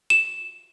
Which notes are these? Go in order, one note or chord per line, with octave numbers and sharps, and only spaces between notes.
E7